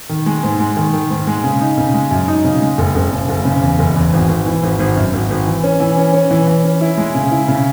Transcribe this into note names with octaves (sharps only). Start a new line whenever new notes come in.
D#3
G#3
G#2
G#3
D#3
D#3
G#2
G#3
C#3
D#4
C#3
G#3
F#2
D#4
C#3
G#3
F#1
F#1
C#3
F#1
C#3
E2
F#1
E2
G#1
G#1
E3
G#1
G#1
F#2
G#1
G#1
E3
C#4
E3
C#4
C#4
E3
E3
C#4
E4
G#3
C#3
E4
C#3